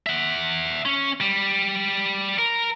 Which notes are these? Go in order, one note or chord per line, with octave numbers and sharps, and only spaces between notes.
E5 F#5
C#4
G3
A#4